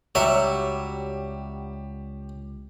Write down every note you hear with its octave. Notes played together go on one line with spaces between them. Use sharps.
C#2 F#3 G3 G4 C#5 E5